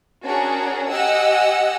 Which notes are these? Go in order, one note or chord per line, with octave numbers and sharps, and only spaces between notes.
C#4 D4 F#4 G#4 A#4
G4 D#5 F#5 G#5 E6